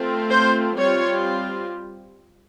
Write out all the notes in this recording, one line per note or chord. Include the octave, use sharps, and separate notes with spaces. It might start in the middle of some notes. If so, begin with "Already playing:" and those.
Already playing: A3 C4 F4
C5
G3 C4 F4 C#5